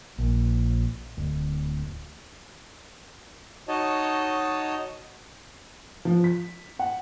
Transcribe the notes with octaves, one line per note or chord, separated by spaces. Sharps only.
A#1
D1
D#4 F#4 C#5 D#5 A5
F3
B6
F#5